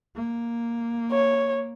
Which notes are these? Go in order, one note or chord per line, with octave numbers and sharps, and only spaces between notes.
A#3
C#5